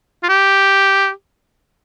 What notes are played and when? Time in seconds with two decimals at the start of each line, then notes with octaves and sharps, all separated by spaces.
0.23 F4
0.29 G4